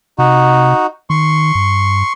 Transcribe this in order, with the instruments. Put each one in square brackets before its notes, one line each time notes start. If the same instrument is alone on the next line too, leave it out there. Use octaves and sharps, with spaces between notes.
[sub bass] C3 [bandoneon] D#4 F#4
[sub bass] D#3 [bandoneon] C6 C#6
[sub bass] G2